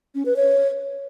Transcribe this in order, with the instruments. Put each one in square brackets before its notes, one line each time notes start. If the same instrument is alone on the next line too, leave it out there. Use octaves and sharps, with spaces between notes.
[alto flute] C#4
B4
C#5